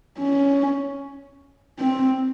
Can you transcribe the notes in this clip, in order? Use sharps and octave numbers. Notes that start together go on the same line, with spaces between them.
C#4
C4